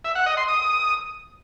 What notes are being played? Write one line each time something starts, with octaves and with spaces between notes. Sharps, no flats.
E5
F#5
D#5
C6
D#6